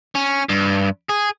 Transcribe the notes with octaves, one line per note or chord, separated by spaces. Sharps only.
C#4
G2
G#4